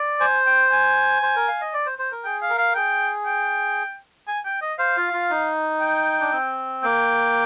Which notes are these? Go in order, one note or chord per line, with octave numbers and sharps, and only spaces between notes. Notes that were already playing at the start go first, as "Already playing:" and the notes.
Already playing: D5
C5 G#5
G5
G#5
C5
A#4
F5
D#5
D5
C5
C5
A#4
G#4 G5
F5
A#4
F5
G#4 G5
G5
G#5
G5
D#5
C5 F5
F4
F4
D#4
G5
D4
C4
A#3 G5